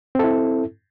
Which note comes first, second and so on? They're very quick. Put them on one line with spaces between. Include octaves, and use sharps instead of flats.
C4 A4 E4